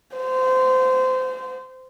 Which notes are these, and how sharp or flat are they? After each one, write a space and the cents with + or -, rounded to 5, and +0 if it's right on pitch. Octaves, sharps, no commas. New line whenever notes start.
C5 -25